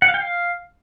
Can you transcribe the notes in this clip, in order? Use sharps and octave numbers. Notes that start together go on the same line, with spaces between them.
F#5
F5
G5
F5